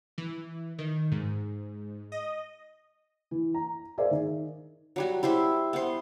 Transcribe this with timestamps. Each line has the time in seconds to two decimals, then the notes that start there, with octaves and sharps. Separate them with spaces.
0.18 E3
0.79 D#3
1.12 G#2
2.12 D#5
3.31 E3
3.54 A#5
3.98 G#4 A#4 C5 D5 E5 F5
4.11 D#3
4.96 F#3 G3 F#4
5.23 E4 G4 C5 E5
5.73 B3 C5